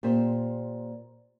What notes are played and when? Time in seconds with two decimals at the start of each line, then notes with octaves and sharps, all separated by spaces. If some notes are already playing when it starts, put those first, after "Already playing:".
0.03 A#2 G4 C5